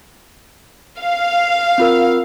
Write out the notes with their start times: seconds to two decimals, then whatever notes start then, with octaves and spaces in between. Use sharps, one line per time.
1.00 F5
1.78 C4 F4 A#4